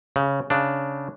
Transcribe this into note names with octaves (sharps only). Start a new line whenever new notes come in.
C#3
C#3 D4